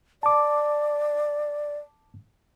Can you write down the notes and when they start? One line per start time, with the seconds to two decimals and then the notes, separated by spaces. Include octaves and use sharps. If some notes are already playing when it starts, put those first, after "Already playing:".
0.23 D5 A5 D6